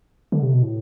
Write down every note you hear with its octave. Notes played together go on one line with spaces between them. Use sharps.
D3
C3
B2
A2